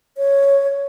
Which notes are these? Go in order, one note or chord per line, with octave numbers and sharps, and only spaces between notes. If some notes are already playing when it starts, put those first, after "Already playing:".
C#5